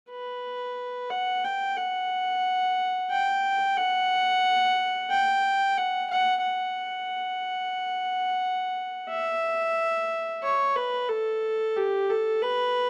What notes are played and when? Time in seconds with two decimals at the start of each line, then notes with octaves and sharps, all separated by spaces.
0.10 B4
1.10 F#5
1.44 G5
1.77 F#5
3.11 G5
3.77 F#5
5.10 G5
5.77 F#5
6.10 F#5
6.42 F#5
9.09 E5
10.43 C#5
10.76 B4
11.09 A4
11.76 G4
12.10 A4
12.42 B4